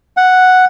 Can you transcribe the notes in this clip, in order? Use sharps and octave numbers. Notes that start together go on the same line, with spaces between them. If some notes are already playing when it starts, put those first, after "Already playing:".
F#5